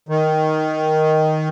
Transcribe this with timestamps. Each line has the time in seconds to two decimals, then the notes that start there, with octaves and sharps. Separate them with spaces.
0.09 D#3